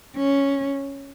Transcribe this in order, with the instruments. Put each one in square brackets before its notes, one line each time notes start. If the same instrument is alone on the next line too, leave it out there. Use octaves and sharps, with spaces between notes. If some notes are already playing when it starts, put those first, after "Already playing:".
[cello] C#4